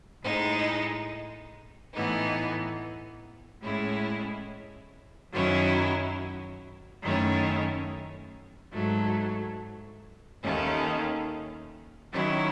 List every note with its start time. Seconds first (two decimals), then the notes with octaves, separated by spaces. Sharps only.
0.23 A2 G#3 D#4
1.93 A2 E3 B3 D#4
3.62 A2 G#3 C#4 E4
5.32 F#2 D#3 F#3 C#4 E4
7.03 F#2 D#3 A3 C#4 E4
8.72 G#2 F#3 A3
10.43 D#2 D#3 A3 C#4
12.12 D#3 F#3 C#4 E4